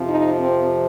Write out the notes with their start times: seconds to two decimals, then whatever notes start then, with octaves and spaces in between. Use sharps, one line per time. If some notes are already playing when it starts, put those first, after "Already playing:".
Already playing: F2 C3 F3
0.09 D#4
0.40 C4